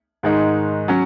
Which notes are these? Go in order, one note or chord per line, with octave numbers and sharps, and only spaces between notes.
G#2 D#3 G#3 D#4
F#3 C#4